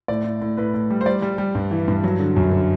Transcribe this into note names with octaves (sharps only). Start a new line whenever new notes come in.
A2 D5
A2
A2
A2 B4
A2
G3
C5
G3 D5
G3
G3
G2
E3
G2
F#3
D3
F#2
D3